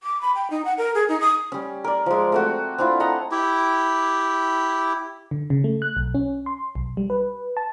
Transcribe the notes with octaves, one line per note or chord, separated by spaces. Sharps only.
D6
B5
G5
D#4
F#5
A#4
G#4
D#4
D#6
G3 C#4
A#4 D5
F3 G#3
A3 C4 F#4
C4 D4 E4 F4
D#5 F#5 A5 A#5
E4 G4
D3
C#3
A3
F#6
B1
C#4
C6
B1
G3
B4
A5